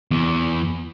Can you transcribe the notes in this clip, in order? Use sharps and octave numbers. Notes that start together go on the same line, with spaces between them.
E2